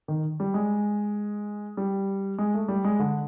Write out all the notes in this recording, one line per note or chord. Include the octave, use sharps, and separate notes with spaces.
D#3
G3
G#3
G3
G#3
A3
G3
G#3
D3